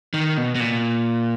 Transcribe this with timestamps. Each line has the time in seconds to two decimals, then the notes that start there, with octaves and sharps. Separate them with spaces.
0.14 D#3
0.37 B2
0.55 B2
0.60 A#2